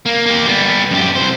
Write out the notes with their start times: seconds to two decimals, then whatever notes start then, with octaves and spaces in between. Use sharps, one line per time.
0.06 A#3
0.26 A#3 G4
0.47 G3 B3
0.91 F#2 G4
1.15 C2 C5